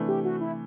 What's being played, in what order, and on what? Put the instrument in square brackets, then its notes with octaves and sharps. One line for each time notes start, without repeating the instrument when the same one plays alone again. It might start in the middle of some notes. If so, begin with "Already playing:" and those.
Already playing: [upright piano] C3 E3 A3 D4
[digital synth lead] G4
F#4
E4